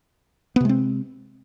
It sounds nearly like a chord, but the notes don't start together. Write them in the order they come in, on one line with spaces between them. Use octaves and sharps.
B3 C3 G#3 C4